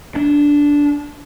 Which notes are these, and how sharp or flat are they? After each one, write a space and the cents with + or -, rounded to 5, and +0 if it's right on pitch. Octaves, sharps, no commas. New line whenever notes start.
D4 -10